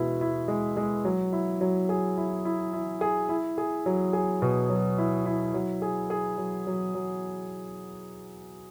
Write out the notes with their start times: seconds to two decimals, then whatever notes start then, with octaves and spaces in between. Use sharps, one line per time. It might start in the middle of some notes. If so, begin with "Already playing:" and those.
Already playing: B2 G#3 E4
0.21 E4
0.48 G#3
0.77 G#3
1.05 F#3
1.33 E4
1.61 F#3
1.89 G#4
2.18 E4
2.45 E4
2.73 E4
3.01 G#4
3.29 E4
3.58 G#4
3.86 F#3
4.13 G#4
4.42 B2
4.70 F#3
4.98 E4
5.26 E4
5.54 F#3
5.82 G#4
6.10 G#4
6.38 F#3
6.67 F#3
6.95 F#3